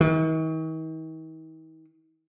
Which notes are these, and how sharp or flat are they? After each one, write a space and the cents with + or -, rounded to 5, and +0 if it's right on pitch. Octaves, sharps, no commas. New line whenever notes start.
D#3 +45